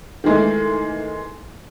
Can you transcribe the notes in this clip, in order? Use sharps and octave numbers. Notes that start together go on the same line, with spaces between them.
D#3 E3 G#3 A3